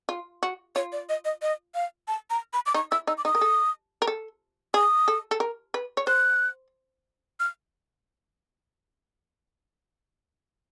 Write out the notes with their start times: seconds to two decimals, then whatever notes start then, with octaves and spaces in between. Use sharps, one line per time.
0.09 F4
0.43 F#4
0.75 F4 C#5
0.92 D5
1.09 D#5
1.25 D#5
1.42 D#5
1.75 F5
2.08 A5
2.30 A#5
2.53 B5
2.66 D6
2.74 D#4 C#6
2.91 E4 E6
3.07 D#4 E6
3.18 D6
3.25 D#4 D#6
3.35 A#4
3.41 A4
4.02 A#4
4.07 A4
4.74 G#4 D#6
5.08 A4
5.31 A4
5.40 A#4
5.74 B4
5.97 C#5
6.07 C5 F#6
7.40 F6